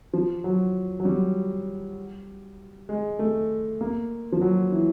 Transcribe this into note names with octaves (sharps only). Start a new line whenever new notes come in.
F3
F#3
F#3
G3
G#3
A3
A#3
F3
F#3
E3